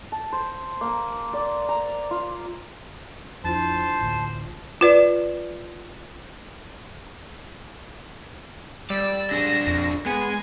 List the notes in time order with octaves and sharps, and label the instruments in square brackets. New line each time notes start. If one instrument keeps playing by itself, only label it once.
[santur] A5
C5
A#3
D5
A#5
F4
[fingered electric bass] F2 [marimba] D4 E4 F4 [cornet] C5 [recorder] A5
[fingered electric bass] A1 D2
[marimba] F4 B4 D5
[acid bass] G3 [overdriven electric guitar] D5 [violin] E6
[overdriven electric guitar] D4 G#4 [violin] A#6 E7
[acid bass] F2
[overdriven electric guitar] G#3 G#4 [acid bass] B3 [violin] G#5